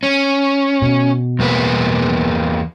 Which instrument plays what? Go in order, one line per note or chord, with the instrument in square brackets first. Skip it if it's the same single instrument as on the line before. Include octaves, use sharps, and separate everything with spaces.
[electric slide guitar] C#4
[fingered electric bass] B2
[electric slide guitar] E2 A#3 B4